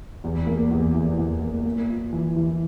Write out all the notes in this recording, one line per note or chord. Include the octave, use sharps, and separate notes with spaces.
E2
A#3
E2
E3
E2
A#3
A#3
F4
E3
E3